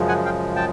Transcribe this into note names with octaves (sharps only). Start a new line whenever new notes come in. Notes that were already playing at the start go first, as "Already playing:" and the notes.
Already playing: F#2 C#3 F3 G#3
F#5 G#5
F5 G5
G5 A5